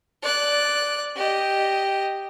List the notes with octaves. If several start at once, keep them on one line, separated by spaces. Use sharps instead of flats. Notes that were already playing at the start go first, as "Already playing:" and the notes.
D5 F#6
G4 D#5